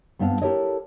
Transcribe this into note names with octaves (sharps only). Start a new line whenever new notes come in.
G2 B3 C4 D4 F5
E4 G4 A4 A#4 C#5 D#5